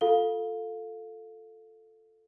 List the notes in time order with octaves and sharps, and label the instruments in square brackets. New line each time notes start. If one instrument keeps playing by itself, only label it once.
[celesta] F4 A4 F5 G7